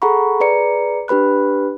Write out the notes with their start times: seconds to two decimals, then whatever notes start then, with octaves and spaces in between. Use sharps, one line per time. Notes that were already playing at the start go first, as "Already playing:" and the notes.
0.02 G#4 A4 F#5 A#5 B5 C#6
0.40 G#4 B4 D5 A#5 C#7
1.08 D4 G4 B4 B5 F#6